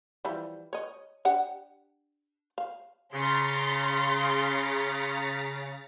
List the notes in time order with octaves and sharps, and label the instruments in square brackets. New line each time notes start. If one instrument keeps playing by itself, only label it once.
[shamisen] E3 F3 G3
C#5 D#5
D4 G4 F#5
F5
[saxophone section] C#3 [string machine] A#5 A6 B6 [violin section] C6